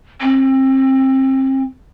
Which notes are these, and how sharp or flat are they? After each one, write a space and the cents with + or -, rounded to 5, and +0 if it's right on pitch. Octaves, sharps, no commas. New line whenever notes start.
C4 +30